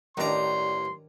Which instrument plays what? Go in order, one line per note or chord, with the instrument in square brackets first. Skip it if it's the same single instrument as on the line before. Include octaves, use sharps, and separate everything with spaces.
[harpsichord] A1 A#5 [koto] D#3 D4 [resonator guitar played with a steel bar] G3 F#4 D5 [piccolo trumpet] C6